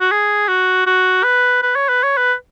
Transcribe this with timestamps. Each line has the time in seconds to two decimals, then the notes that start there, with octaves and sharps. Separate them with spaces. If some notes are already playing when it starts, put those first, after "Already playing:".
0.01 F#4
0.11 G#4
0.48 F#4
0.87 F#4
1.24 B4
1.62 B4
1.76 C#5
1.89 B4
2.04 C#5
2.17 B4